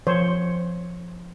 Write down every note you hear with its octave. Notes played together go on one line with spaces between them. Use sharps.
F3 C5 C#5